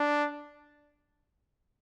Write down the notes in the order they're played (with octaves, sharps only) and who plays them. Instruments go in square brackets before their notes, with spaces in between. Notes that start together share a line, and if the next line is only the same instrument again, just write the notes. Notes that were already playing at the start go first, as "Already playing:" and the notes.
Already playing: [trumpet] D4